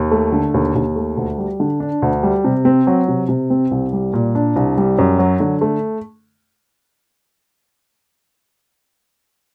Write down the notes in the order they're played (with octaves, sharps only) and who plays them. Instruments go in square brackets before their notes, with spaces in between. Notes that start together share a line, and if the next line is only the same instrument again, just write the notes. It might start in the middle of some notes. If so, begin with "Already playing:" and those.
Already playing: [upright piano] D#2
A3
D3
D#2
D#2
A3
D2
G3
D3
D4
D2
G3
C3
C4
F#3
C3
C3
C4
C2
G3
A#2
D4
C2
G3
F#2
F#3
D3
A3